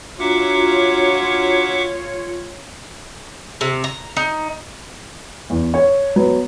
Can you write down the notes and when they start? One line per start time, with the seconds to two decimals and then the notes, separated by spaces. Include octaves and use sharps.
0.19 D4 F4 F#4 C#5 E5 F#5 A#5 D6
3.61 C3
3.84 A#5
4.17 D#4
5.50 E2
5.74 C#5
6.16 F#3 B3